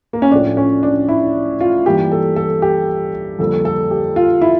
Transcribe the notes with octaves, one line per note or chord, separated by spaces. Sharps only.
A#3
C#4
A2 F3 A3 D4
C#4
D4
E4
F4
G2 E3 G3 A#3 G4
A4
A4
G4
F2 D3 G3 A#3 A4
A4
G4
F4
E4